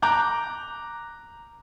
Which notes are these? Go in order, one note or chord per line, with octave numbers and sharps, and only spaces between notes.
A#5 D6 F#6 G6